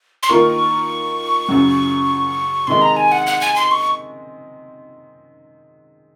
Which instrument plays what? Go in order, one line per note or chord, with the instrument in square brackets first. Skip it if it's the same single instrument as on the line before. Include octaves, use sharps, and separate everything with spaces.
[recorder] C6
[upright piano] D#3 A#3 F4 A#4 [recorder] C#6
[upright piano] F#2 C#3 F#3
[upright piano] C3 D#3 G#3 [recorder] C6
[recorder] A#5
G#5
F#5
F#5
G#5
C6
C#6